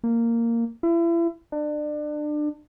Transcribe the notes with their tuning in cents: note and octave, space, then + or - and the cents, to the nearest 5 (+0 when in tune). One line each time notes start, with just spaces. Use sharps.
A#3 -10
E4 +35
D4 +30